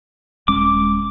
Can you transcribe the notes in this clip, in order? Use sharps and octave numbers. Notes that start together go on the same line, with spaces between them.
D#1 G#3 C#4 D6